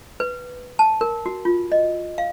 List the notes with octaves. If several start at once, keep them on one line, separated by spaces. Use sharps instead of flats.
B4
A5
A#4
F#4
F4
D#5
F5